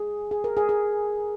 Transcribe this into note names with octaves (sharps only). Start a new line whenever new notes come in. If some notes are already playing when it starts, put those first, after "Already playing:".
Already playing: G#4
G#4
A#4
G#4
G#4